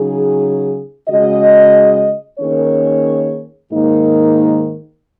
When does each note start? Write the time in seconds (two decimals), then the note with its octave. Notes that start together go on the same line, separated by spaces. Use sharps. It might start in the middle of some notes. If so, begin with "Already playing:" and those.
Already playing: C#3 F#3 D#4 G#4
1.09 C#3 G#3 F#4 D#5
2.40 D#3 A#3 C#4 G#4 C#5
3.72 G#2 D#3 A#3 D#4